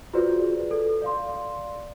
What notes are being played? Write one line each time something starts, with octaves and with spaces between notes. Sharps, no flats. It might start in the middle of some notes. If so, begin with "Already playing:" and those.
F4 F#4 G#4 B4 C5 D5
A4
D5 F5 C6